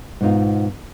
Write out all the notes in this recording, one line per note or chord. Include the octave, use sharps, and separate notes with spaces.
G#2 B2 B3 D#4 F4